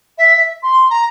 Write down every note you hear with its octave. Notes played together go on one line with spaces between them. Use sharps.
E5
E5
C6
A#5